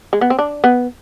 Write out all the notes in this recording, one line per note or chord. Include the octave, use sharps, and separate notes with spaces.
G#3
B3
C4
D4
B3